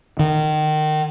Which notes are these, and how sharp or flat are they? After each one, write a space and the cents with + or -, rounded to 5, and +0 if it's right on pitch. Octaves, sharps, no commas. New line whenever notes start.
D#3 -25